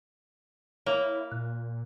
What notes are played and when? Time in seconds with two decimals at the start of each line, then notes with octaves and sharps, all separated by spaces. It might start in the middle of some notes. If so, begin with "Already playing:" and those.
0.86 A#3 E4 C#5
1.32 A#2 F#6